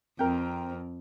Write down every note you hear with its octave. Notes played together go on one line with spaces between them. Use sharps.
F2 C4 A#4 G5